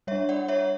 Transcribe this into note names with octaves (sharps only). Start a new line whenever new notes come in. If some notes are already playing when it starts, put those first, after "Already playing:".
G3 D4 C#5 E5
D5 F#5
C#5 E5